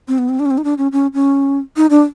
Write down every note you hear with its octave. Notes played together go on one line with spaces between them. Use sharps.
C4
B3
C4
D4
C#4
C4
D#4
D4
C#4
C#4
C#4
D#4
D4